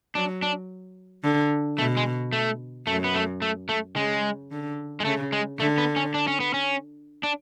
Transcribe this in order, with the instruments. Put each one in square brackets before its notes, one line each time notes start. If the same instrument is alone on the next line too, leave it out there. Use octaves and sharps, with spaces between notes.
[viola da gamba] F#3 [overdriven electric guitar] D4
[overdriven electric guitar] D4
[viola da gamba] D3
[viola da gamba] B2 [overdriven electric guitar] A3
[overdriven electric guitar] G#3
A3
[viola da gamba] F#2 [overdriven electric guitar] A3
[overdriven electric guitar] B3
A3
A3
A3
[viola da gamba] C#3 [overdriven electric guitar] G#3
[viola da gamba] D3
[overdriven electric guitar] G#3
[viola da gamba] C#3 [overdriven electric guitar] A3
[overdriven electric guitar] G#3
[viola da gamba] D3 [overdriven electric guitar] A3
[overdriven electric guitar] B3
C#4
D4
C#4
B3
C#4
D4